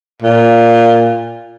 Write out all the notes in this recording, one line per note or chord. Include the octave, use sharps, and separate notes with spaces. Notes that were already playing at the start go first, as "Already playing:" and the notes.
A#2